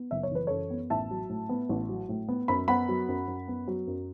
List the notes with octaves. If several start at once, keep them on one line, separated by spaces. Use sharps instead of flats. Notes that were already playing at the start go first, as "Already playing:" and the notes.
Already playing: B3
F#1 E5
C#5
E3 B4
F#2 A4 C#5
B3
A1 E5 A5
F#3
A2
B3
A1
F#3
A2
B3
F#2 B5
B3 F#5 B5
F#3
F#2
F#2
B3
F#3
F#2